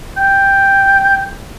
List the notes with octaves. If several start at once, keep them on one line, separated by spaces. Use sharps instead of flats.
G5